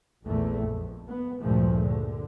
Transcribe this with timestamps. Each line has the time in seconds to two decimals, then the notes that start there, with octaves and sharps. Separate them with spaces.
0.23 A#1 E2 A#2 A3
0.63 F2
1.08 B3
1.42 D2 G2 A#2 F3 G#3 A3
1.86 D3